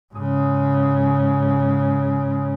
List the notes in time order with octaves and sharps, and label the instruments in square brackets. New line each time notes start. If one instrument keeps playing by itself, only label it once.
[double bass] G#2 C#3